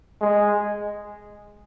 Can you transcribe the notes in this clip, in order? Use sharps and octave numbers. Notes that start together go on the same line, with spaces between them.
G#3